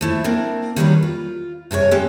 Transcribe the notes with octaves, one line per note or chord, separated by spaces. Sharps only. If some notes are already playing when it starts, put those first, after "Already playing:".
F3 A3 E4
A#3 C4 D4 A#4
D#3 F#3 G3 A#3 C#4 B4
F4
G2 C3 G#4 C#5
G#3 B3 C#4 G4 A4 G5